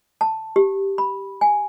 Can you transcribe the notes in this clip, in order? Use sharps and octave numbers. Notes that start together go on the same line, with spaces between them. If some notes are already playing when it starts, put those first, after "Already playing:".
A5
G4
B5
G#5